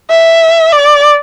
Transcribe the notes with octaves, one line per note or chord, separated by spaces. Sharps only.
E5
D5